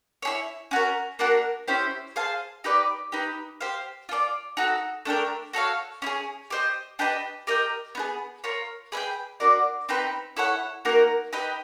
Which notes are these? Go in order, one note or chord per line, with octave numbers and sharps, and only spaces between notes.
E4 G#4 C#5
C#4 F#4 A#4
A#3 D4 F#4 A#4
C#4 E4 G4 C5
G#4 C5 F5 A5
D#4 G4 B4 D5
D#4 G4 B4
G4 C5 F5
F4 A4 D5
D#4 F#4 A4
A3 D4 G4 A#4
F#4 A4 C#5 F5
C#4 E4 G#4
G4 C5 D#5
D4 G4 B4 D#5
G4 A#4 D#5 G5
B3 D#4 G#4
F4 A#4 C#5
G#4 B4 E5 G5
D4 F#4 A#4 D5
C4 D#4 G4 B4
E4 A4 C#5 F#5
A#3 D#4 F#4 A#4
D#4 G4 B4 D#5